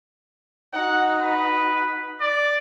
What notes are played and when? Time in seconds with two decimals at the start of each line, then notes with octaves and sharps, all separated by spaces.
0.73 D#4 F#4 F#5
1.21 B4
2.21 D5